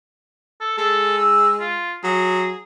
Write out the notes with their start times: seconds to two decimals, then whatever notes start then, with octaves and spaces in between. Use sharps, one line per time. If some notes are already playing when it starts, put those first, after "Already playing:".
0.61 A4
0.78 G#3 A4
1.18 E6
1.60 F4
2.04 F#3 G#4